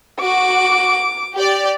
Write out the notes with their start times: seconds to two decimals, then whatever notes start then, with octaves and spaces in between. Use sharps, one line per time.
0.21 F#4 D6
1.33 G4 D5